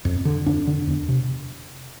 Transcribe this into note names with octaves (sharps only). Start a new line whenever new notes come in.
F2
D3
F2 D4
D3
E2
C3